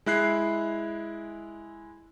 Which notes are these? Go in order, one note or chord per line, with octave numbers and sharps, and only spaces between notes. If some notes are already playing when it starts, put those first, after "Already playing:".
G#3 E4 F#6 C7